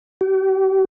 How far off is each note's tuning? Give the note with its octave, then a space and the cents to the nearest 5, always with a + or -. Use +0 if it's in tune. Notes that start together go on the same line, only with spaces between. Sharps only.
G4 -40